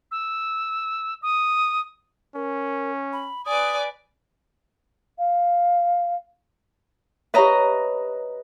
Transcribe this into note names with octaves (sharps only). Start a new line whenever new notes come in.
E6
D#6
C#4 A#4
B5
B4 D5 G#5 D#6
F5
G4 B4 C#5 D#5 E5 A#5